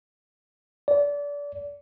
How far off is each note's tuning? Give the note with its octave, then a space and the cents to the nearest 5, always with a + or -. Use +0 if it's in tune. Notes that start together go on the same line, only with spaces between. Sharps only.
D5 -30